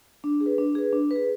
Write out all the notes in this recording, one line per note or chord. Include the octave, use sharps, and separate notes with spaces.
D4
G#4
B4
D4
G#4 B4
D4
G#4 B4